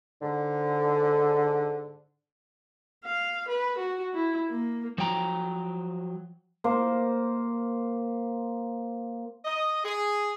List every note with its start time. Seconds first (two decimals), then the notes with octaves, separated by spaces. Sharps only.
0.22 G#2 D3
3.05 F5
3.49 B4
3.79 F#4
4.14 E4
4.50 A#3
4.98 F3 F#3 G5 A#5
6.64 A#3 C5
9.45 D#5
9.84 G#4